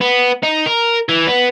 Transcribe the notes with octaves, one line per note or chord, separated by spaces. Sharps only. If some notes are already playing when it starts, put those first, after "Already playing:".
B3
D#4
A#4
E3
B3